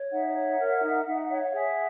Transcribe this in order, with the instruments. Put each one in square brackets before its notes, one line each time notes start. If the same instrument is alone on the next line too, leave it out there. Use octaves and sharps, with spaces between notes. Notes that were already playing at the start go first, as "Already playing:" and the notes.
Already playing: [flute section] C#5
D#4 E5 F#5
C#5
A#4
D#4
D#4
C#5
F5
G#4 E5 F#5